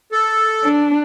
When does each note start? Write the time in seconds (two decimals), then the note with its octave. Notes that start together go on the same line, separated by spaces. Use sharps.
0.12 A4
0.63 D4